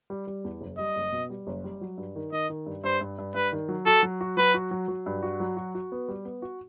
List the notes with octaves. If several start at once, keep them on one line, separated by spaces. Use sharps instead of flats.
G3
G3
E2
F#1
G3 D#5
F#1
B2
G3
F#1
G3
F#3
G2
D#3
D#3 D#5
D#3
G2
G2 C5
G2
G2
G2 B4
D#3
F#3
F#4 A4
F#3
F#4
F#3 B4
F#4
F#3
F#3
G2
F#4
F#3
F#4
F#4
B3
G3
B3
F#4